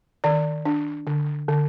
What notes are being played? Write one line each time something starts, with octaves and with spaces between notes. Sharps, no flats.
D#3 D5
D4
D3
D3